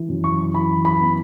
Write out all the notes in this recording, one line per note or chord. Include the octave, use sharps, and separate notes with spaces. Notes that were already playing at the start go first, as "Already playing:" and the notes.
Already playing: E3
F#2
C#6
E3 B5
B5
B3